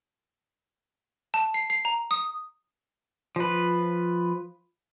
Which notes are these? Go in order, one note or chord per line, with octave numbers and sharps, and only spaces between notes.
A5
C7
C7
A#5
D#6
F3 B4